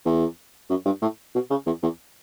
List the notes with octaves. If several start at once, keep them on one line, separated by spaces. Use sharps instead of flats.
E2
F#2
G2
A2
B2
C#3
E2
E2